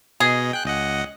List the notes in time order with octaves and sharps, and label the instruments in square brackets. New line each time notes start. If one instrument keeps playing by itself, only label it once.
[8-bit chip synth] B2 D#5 [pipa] G#4
[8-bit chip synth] G5 F#6
C#2 D#5 F#5